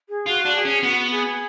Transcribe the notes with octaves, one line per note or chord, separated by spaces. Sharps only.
G#4
F4 F#4
D4
G#4
C#4
B3 F#4
G#4